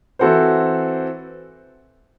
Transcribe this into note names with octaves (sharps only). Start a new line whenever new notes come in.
E3 C4 F#4 A4 C5